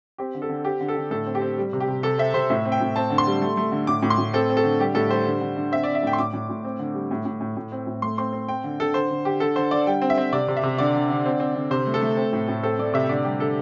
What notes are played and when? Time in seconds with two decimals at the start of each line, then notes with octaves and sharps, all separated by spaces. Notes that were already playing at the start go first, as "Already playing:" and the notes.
0.18 C4 G4
0.35 D3
0.42 A4
0.49 D3
0.65 C4 G4
0.81 D3
0.88 A4
0.96 D3
1.11 A2 A4
1.26 C4
1.35 G4
1.41 C4
1.58 G3
1.73 C3
1.80 G4
1.88 C3
2.03 C3 A4
2.18 C4 E5
2.34 C3 C5
2.50 A2 E5
2.65 C4
2.72 G5
2.81 A2
2.96 C4 A5
3.10 D3
3.18 C6
3.27 G3
3.42 A3
3.57 A3
3.72 D3
3.87 A2 D6
4.03 A2
4.10 C6
4.18 A2
4.34 C4 A4
4.50 C4
4.57 A4
4.64 D3
4.79 G3 G4
4.95 A2 A4
5.10 G3 C5
5.27 D3
5.41 D3
5.56 D3
5.72 C4 E5
5.83 C4 D5
5.95 E5
6.03 A2 G5
6.13 C6
6.19 A2 D6
6.33 A2
6.49 A2
6.65 C4
6.79 D3
6.94 G3
7.11 A2
7.25 A2
7.41 A2
7.57 A2
7.72 C4
7.87 A2
8.02 A3 C6
8.18 C4 C6
8.33 C4
8.48 C4 G5
8.64 D3
8.80 D3 A4
8.94 D3 C5
9.10 D3
9.25 D3 G4
9.40 D3 A4
9.56 D3 C5
9.71 D3 D5
9.87 G3 G5
10.02 C4
10.10 E5
10.18 C4
10.32 C3 D5
10.48 C3
10.57 E5
10.63 C3
10.78 D3 D5
10.95 D3
11.10 D3
11.26 C4
11.40 C4
11.55 D3
11.71 C3 C5
11.87 A3
11.94 A4
12.01 A3
12.17 C4
12.33 A2
12.48 A2
12.63 C4 A4
12.78 A3 D5
12.94 C3 E5
13.09 D3 D5
13.24 G3 G4
13.40 D3 A4